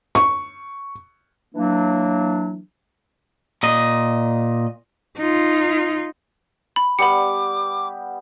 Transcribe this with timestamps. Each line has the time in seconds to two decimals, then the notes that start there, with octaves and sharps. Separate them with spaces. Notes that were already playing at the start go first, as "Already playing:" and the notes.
0.15 C#6
1.55 E3 F#3 A#3 D4
3.63 A#2 D#5
5.17 D#4 F4
6.76 B5
6.99 G3 B3 B5 D6 C#7